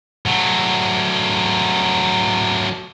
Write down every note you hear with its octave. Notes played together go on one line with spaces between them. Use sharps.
F#3 A3